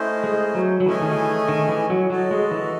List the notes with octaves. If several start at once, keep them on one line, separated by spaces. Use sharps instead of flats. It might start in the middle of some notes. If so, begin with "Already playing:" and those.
Already playing: A3 C#4 E4 C5 D#5
G#3
F#3
F#3
E3 A3 C#4 G#4 D#5 G#5
D#3
E3
D#3
E3
F#3
F#3 F#4 A4 D#5
G#3
E3